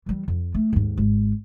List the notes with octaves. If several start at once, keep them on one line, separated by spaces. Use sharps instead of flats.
E3 G3
F2
A3
D#2 G#2
G#1